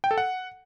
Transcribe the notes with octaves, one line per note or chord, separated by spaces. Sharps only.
G5
A4
F#5